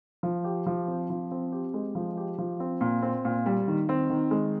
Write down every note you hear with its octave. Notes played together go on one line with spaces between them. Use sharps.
F3
G4
F3
C4
F3
C4
G4
G#3
F3
G4
F3
C4
A#2
C4
A#2
G3
D#3
C4
D#3
G#3